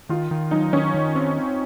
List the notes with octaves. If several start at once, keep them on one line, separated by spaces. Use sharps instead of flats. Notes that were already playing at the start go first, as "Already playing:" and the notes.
D#3 F4
D#3
F#3 D#4
D#3 C#4
D#3
C4
C4